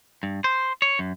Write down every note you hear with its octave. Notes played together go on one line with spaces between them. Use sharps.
G2
C5
C#5
F#2